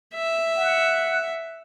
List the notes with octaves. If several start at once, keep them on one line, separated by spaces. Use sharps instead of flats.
E5
F#5